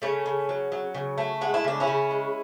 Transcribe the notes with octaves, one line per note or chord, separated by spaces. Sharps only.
C#3 A3 C#4
C#3
F#3
F#3
C#3
A3
G#3 F#4
E4
C#3 D4
C#4 E4
C#3
G#3